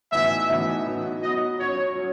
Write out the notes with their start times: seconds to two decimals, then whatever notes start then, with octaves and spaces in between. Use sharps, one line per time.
0.12 A2 E3 B3 D#4 F#4 E5
0.49 A2 E3 B3 D#4 F#4
0.86 F#3 B3 D#4 F#4
1.22 F#3 B3 D#4 F#4 D#5
1.59 F#3 C#4 F#4 C#5
1.95 F#3 C#4